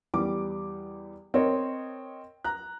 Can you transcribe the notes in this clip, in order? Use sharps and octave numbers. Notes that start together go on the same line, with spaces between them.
E2 G3 D6
C4 A#4 C#5 D#5
A#5 F#6